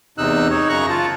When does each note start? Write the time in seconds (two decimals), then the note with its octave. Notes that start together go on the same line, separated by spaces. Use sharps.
0.18 E2 C3 D#4 E6 F#6
0.51 D#4 C#5
0.69 F#2 C#3 A#5 C#6 F#6
0.89 F4 A5